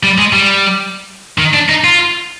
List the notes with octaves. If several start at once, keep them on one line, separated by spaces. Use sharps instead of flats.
G3
G#3
G3
D#3
D4
D#4
F4